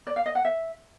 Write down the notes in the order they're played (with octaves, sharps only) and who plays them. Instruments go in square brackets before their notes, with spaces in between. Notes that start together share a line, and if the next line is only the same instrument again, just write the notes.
[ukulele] D5
F5
D#5
F#5
E5